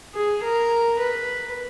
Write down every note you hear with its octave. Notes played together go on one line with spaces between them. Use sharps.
G#4
A#4
B4